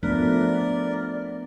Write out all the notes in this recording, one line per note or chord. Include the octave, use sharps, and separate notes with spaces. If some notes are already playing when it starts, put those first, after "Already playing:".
F3 A3 B3 D4 A#4 D5